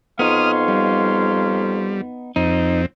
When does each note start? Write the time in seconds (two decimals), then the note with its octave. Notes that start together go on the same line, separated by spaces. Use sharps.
0.19 F2 B3 D#4 C#5 F5 C6 D#6 F6
0.68 G3
2.36 F2 C4 D#4